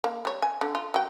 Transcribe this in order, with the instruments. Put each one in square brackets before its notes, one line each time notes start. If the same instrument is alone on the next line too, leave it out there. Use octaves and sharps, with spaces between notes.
[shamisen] A#3
G3 C#5
G#5
D3
F4
F#3 G5